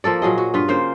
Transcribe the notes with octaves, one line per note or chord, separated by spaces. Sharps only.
F3 A#3 A4 D5
A#2 F#3 G#4 D#5
F#4
G2 F4 B4
C#3 A#3 C5